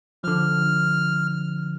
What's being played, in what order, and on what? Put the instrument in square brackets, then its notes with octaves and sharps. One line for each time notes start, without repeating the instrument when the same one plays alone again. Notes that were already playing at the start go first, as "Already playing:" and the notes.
[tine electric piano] D3 F3 [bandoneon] F6